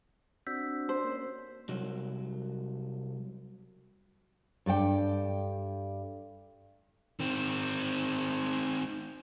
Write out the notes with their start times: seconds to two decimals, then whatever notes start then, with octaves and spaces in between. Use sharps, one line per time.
0.47 C4 D4 F#4 E6 G6 B6
0.89 C5
1.04 A#3 C#4
1.69 C2 F#3
4.66 G2 A4 D5 G5
7.20 D#3 C4